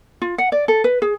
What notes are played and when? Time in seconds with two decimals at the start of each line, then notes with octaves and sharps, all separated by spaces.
0.22 F4
0.38 F#5
0.52 D5
0.68 A4
0.84 B4
1.02 G#4